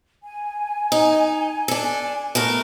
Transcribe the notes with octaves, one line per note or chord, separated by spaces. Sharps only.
G#5
D#4
D4 A4
A3 B3 A#4